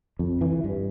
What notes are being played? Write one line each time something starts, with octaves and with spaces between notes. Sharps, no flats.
F2
E3
G2